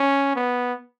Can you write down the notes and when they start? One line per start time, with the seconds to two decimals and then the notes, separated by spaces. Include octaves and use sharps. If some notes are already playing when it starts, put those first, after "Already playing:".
Already playing: C#4
0.36 B3